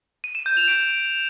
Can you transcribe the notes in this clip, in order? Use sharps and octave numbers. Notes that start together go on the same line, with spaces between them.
D#7
E7
G6
F7
D7